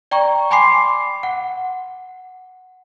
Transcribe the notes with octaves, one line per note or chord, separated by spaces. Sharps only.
D5 G5 A#5 C#6
G5 G#5 B5 C6 D6 C7
F#5